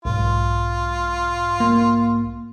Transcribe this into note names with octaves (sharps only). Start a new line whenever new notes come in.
B1 G#2 F4
A#3